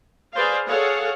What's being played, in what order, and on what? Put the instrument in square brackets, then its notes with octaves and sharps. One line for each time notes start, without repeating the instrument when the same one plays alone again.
[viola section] G#4 B4 C5 D5 F5
G#4 A4 C#5 F5 F#5